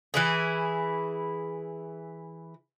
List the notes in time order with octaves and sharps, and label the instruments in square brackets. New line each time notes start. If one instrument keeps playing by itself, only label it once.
[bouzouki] E3 E4 G#4